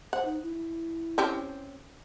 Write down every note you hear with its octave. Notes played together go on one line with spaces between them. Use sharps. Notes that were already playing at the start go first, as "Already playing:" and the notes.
C5 F#5
D#4
E4
C4 C#4 G4